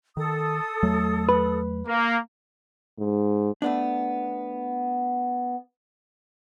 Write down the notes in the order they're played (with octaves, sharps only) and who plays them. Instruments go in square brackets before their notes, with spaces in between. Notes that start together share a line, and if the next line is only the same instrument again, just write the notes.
[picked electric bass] D#3 [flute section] A4 D#6
[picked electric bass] E2 F#3 A3
[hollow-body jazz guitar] B4
[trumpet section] A#3
[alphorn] G#2
[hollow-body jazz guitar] A3 B3 D4